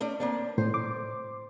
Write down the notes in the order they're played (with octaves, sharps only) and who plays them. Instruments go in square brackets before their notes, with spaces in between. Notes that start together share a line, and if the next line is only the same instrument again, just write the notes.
[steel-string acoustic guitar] A3 C#4 D5
A#3 C4 D4
[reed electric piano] A2 [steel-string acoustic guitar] C5
[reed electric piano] D6